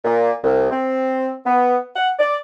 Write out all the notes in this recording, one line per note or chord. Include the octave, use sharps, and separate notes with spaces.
A#2
C2
C4
B3
F#5
D5